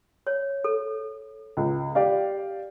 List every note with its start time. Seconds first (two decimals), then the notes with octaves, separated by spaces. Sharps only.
0.27 C#5
0.64 A4
1.57 C#2
1.95 G4 D5 F5